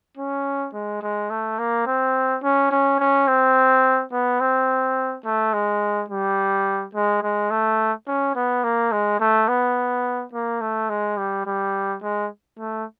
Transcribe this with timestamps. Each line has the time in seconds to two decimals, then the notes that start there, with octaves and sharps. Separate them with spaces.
0.17 C#4
0.74 G#3
1.02 G#3
1.30 A3
1.59 A#3
1.86 C4
2.43 C#4
2.71 C#4
2.99 C#4
3.28 C4
4.12 B3
4.41 C4
5.25 A3
5.53 G#3
6.09 G3
6.95 G#3
7.23 G#3
7.51 A3
8.07 C#4
8.35 B3
8.64 A#3
8.92 G#3
9.20 A3
9.48 B3
10.33 A#3
10.61 A3
10.89 G#3
11.17 G3
11.46 G3
12.02 G#3
12.59 A3